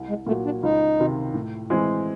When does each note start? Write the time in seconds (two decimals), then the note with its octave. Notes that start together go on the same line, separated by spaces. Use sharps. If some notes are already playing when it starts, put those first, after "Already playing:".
Already playing: C2
0.09 G#3
0.27 A#2 F#3 A3
0.45 D4
0.63 C#2 D#4
0.99 C3 D#3
1.34 A2
1.70 E3 G#3 C4